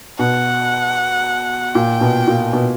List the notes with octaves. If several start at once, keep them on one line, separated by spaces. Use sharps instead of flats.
B2 F#5
A#2 G5
B2
A#2
B2